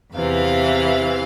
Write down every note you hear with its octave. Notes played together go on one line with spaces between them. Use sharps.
E2 C3 E3 F5